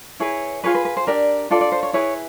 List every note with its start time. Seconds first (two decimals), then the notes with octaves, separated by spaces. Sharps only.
0.20 E4 G#4 B4 C#5
0.64 F4 G#4 B4 C#5
0.75 B4
0.85 B4
0.97 C5
1.07 D4 G4 A#4 D5
1.50 D4 F4 A4 D5
1.61 D5
1.72 C5
1.83 C#5
1.93 E4 G#4 B4 C#5